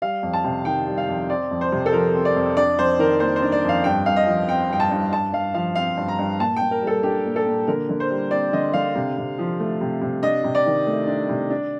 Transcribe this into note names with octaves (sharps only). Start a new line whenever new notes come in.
G3 F5
F2
A5
C3
D#3 G5
G3
F5
F2
C4 D5
F2
C5
C3
A4
F3 A#4
C4
D5
F2
D4 D5
F2 C5
D#3 A#4
A#3 C5
C5
D4
D5
F2
F5
G2 G5
G2 F5
D#5
F3
C4 G5
G2 G5
A5
G2
G2 A5
G2 F5
F3 F5
C4 F5
G2
A#5
G2
A#2 A5
A#2 G5
A#4
G3
A4
D4 G4
A#2
A4
A#2
D3 A#4
D3
C5
G3
C4 D5
D3 D#5
D3 F5
C3
C3
F3
A3
C3
C3
D4 D#5
C3
D5
D#3
A3
D4
C3
D4